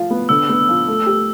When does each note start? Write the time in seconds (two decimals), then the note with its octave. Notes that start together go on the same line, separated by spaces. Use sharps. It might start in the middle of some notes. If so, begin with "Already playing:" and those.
Already playing: F3 F4
0.11 B3
0.29 D3 E6
0.49 B3
0.69 F3
0.88 A3
1.07 G4